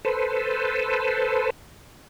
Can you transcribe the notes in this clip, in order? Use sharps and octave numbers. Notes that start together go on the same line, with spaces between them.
A4 B4 C5